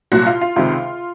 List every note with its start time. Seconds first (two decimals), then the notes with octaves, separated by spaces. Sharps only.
0.12 C2 A#2 F#3 F#4
0.26 F4
0.41 F4
0.56 C#2 C3 D#3 F4